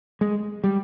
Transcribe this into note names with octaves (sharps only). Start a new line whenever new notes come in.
G#3
G3